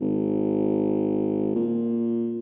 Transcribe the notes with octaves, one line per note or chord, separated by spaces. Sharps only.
G#1
A#2